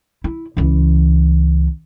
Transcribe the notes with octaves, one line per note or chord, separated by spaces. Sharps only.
E4
C#2 E3